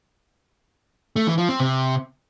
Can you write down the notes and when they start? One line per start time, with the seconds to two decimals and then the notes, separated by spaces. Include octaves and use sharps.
1.16 A3
1.27 E3
1.38 F3
1.49 C4
1.60 C3